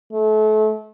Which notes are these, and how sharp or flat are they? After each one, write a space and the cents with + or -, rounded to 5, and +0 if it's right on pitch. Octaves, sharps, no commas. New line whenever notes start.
A3 -30